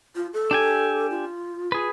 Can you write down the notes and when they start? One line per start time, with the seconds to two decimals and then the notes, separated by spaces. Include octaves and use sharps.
0.16 F4
0.34 A4
0.51 D4 G4 G#5
1.11 F4
1.72 G#4 B4